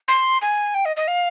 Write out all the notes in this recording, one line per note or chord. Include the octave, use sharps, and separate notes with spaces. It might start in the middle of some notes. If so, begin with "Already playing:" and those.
C6
G#5
G5
D#5
D#5
F5